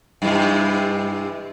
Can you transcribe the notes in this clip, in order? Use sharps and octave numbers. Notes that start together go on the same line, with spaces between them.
G2 C3 E3